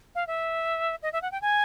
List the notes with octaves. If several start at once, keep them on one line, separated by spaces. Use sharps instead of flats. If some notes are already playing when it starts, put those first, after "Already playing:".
F5
E5
D#5
E5
F#5
G5
G#5